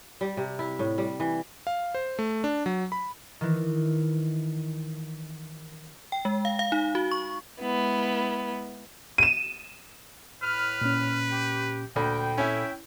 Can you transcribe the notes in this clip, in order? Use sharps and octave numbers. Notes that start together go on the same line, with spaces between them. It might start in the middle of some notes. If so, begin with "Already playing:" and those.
G3
C3
E4
A2
G3
E3
F5
C5
A3
D4
F#3
B5
D#3 E3
G5
G#3
F5
F5
D#4
F#4
C#6
G#3 B3 E4
D#7 E7
A2 B4 F6
A#2 C#4
G4
D2 A#2 A4 G5 B5
C#4 E4 E5